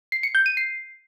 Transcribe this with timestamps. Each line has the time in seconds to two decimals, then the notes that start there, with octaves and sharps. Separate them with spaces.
0.12 C7
0.23 C#7
0.35 G6
0.46 D#7
0.57 C7